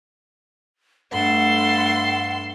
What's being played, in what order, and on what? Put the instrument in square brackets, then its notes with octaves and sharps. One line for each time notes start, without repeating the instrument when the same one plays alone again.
[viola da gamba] G2 A3 A4 [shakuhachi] F#5 [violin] C6